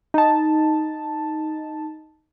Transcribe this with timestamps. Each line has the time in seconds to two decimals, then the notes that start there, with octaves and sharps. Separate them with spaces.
0.14 D#4 A5